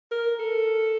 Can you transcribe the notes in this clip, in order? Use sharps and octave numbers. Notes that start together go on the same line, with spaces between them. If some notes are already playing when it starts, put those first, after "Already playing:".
A#4
A4